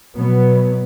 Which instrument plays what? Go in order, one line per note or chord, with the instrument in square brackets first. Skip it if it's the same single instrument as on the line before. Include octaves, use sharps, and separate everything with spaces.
[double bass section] B2 F#3 B3